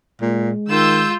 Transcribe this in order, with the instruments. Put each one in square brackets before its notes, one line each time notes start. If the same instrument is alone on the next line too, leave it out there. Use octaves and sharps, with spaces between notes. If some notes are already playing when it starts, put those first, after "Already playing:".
[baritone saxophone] A#2 [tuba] G#3
[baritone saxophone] D#3 [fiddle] F4 [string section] E6 G6